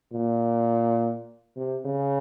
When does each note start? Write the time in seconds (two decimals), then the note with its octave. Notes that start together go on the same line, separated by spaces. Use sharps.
0.13 A#2
1.56 C3
1.85 C#3